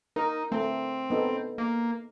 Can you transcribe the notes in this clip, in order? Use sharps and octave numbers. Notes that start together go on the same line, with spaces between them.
D#4 A#4
A3 C4
B3 D#4 A4
A#3